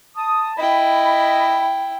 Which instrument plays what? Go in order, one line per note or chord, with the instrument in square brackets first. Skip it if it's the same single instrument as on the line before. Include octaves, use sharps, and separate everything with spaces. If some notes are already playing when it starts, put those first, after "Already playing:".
[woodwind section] A5 D#6
[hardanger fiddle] E4 G5 [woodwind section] D#5 B5